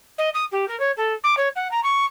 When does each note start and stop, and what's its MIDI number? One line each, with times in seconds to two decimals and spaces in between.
0.18 0.29 75
0.34 0.45 87
0.52 0.67 67
0.68 0.78 70
0.80 0.91 73
0.97 1.14 69
1.24 1.35 86
1.37 1.48 73
1.56 1.70 78
1.71 1.83 82
1.83 2.05 85